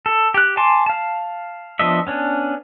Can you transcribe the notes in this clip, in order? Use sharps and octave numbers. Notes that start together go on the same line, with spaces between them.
A4
G4 F#6
G#5 A5 C6 D6
F5 A5
F3 B3 D4 D#5 E5
B3 C#4 D4